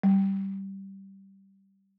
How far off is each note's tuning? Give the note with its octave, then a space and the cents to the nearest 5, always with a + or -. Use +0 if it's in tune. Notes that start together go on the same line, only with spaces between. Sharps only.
G3 -10